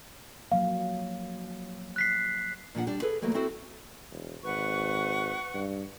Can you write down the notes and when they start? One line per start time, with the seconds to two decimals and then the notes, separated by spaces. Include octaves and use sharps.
0.52 F3 F#3 A#3 F5
1.96 F#6 B6 C7
2.75 A#2 F3 D4 F#5
2.87 G3 D4
3.02 G#4 A4 B4
3.22 E2 F#3 A3 A#3
3.34 C4 E4 F#4 A4 C5
4.11 E1
4.43 G#1 B4 F#5 C#6
5.54 G2